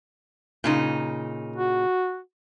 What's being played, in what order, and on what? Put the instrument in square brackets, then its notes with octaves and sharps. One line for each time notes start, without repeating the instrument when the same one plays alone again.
[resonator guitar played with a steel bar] A#2 C#3 D#4
[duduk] F#4